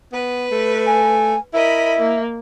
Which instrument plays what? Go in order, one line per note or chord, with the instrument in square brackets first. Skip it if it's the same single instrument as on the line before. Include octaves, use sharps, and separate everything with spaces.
[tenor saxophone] B3 [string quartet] B4
[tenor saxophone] A3
[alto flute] G#5
[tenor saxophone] E4 [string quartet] A#4 D#5 B5 [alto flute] E5
[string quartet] A#3